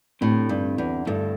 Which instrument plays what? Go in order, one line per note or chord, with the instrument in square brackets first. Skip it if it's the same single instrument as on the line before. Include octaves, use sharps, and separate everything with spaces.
[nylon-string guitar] A2 [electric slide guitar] D3 C4 G4
[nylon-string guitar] G2
E2
[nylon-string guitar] G2 [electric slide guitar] D3 A3 E4 A4